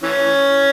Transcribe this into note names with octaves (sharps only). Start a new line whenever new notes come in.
E3 C#4